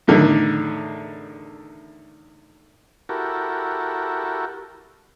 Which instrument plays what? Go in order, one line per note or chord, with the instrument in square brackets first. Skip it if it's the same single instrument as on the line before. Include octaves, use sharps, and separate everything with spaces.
[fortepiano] E2 A2 D3 D#3
[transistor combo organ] E4 F#4 G4 A4 A#4